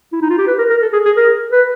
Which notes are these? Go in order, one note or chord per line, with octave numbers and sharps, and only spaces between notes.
E4
D#4
F4
G4
B4
A#4
A#4
A4
G#4
G#4
A#4
B4